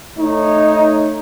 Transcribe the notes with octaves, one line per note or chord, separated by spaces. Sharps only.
A3 D#4 C#5